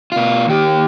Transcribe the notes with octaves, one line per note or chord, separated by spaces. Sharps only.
B2 F4
D#2 G4